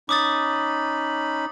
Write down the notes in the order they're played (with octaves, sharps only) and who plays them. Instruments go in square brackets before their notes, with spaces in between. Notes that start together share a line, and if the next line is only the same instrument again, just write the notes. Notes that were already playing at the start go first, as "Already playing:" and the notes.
[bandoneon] C#4 D#4 B5 [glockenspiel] D6 D#6 A6